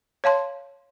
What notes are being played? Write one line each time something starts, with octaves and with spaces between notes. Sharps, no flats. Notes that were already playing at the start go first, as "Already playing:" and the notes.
C#5 F5 A5 C6